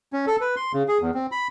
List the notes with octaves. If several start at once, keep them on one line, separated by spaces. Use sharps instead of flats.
C#4
A4
B4
C6
C#3
G#4
E2
C4
B5